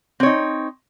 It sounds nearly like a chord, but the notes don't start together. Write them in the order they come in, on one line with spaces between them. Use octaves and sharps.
C4 C#5 D#4